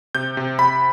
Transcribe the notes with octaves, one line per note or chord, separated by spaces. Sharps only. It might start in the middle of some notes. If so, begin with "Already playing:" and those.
C3 G6
C3
C3 B5